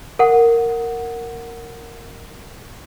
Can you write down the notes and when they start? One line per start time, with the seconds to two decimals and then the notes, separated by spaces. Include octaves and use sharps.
0.19 A#4 F#5